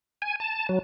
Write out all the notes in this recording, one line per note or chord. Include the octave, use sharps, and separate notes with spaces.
G#5
A5
F#3